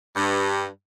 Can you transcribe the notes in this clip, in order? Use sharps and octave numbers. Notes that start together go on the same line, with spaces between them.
G2